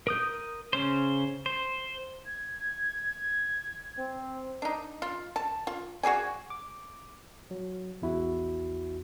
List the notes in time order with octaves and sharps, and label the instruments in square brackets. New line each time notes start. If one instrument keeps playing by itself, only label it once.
[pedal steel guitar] A#4 D#6 G6
C#3 C#4 C5
C5
[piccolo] G#6
[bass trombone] C4
[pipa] D4 D#4
F4
A5
F4
F#4 G#4 D5 G#5
[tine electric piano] D6
F#3
A#1 E2 E4 F#4